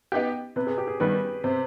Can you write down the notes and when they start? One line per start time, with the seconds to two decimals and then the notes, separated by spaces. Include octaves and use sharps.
0.12 B3 D#4 G4
0.56 C3 B4
0.67 G#4
0.78 G4
0.87 G#4
1.00 D#3 G3 B3 B4
1.44 C3 C5